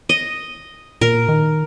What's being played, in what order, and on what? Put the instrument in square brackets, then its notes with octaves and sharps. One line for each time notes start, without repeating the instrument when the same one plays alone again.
[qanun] D#5
[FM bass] A#2 [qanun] A#4
[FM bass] D#3